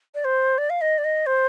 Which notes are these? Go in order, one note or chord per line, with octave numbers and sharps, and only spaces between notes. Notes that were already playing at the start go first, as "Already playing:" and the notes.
D5
C5
D5
F5
D#5
D5
D#5
C5